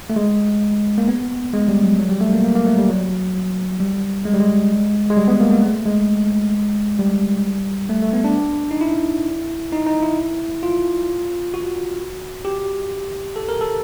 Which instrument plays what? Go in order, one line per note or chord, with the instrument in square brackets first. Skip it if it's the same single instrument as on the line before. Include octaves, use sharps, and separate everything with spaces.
[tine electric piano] A3
G#3
A#3
B3
G#3
G3
F#3
F#3
G3
A3
A#3
A#3
A#3
A3
G3
F#3
G3
G#3
G3
G#3
G#3
G3
B3
A#3
A#3
A3
G#3
G3
A3
A3
B3
D4
D#4
E4
D#4
D#4
E4
F4
F#4
G4
A4
A#4
A4